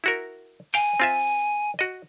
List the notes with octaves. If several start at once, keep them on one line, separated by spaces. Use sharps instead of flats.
E4 F#4 A#4
F5 G5 G#5
C4 F4 E5
F#4 D#5